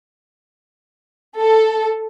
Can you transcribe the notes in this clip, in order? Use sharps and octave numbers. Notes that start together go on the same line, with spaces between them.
A4